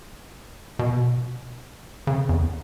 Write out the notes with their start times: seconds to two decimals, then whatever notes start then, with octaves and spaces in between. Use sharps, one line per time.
0.79 B2
2.07 C#3
2.29 E2